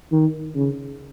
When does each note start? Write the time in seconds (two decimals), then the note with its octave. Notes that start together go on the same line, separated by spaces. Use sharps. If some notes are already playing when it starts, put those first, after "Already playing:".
0.12 D#3
0.55 C#3